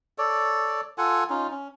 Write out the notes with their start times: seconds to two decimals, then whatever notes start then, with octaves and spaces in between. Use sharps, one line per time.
0.18 A4 C#5 D5
0.98 F4 A4 F#5 G#5
1.30 C#4 D#4 F4
1.51 C#4